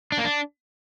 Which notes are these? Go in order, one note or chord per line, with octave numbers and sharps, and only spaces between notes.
D4
A#3
D4